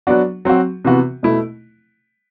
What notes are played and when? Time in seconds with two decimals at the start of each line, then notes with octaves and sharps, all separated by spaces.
0.07 F#3 B3 D4 F#4
0.45 F#3 C4 F#4
0.85 C3 E3 B3 F#4
1.23 B2 A3 E4